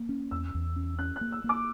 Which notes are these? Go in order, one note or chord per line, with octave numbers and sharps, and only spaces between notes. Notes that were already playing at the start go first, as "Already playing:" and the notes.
Already playing: A#3
C#4
E2 E6
E2
C#4
C#4 F#6
F#6
A#3
E6
A#3
D6